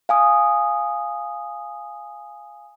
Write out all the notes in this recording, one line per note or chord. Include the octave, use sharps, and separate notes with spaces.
F5 G#5 D#6